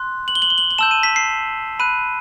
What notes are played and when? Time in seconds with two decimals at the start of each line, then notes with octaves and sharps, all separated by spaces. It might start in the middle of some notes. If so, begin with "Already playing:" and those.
Already playing: C6 F#6
0.28 F#7
0.35 G7
0.42 F#7
0.50 G7
0.58 F#7
0.71 F#7
0.78 A5 E6 G6 E7
0.91 D#7
1.03 B6
1.16 C7
1.79 B5 F#6 D#7